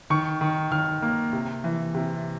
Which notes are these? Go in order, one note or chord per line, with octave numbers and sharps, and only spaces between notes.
D#3 C#6
D#3
D#3 F6
A#3
C3
E3
C3